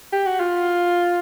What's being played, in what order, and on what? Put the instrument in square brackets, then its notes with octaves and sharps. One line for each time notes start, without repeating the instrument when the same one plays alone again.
[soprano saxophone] G4
F#4
F4